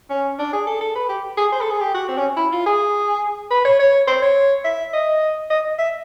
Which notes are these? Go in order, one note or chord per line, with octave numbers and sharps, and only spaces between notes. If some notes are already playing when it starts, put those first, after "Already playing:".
C#4
D4
G#4
A4
A4
B4
G4
G#4
C5
A4
G#4
G4
F#4
C4
C#4
E4
F4
G#4
B4
C#5
C#5
C5
C#5
E5
D#5
D#5
E5